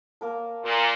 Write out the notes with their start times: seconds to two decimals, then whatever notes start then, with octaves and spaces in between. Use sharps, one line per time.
0.21 A#3 A#4 A5
0.64 A#2